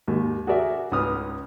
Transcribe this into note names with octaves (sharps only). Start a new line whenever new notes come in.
D#2 G#2
F#4 G#4 A#4 D5 E5
C#2 G#2 B4 D#6 F6